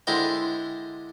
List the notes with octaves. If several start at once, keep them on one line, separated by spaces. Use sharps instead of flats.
D3 G#3 E4 G4 A#4 C5